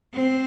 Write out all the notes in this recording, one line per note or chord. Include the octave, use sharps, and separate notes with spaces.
C4